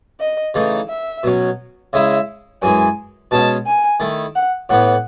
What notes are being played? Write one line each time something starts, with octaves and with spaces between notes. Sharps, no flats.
D#5
C#3 E3 A3 D#4
E5
B2 F#3 C#4
C#3 G#3 C#4 E4 E5
F#2 E3 G#3 G#5
B2 G#3 C#4 A5
G#5
D#3 A3 E4
F#5
A2 E3 B3 F#5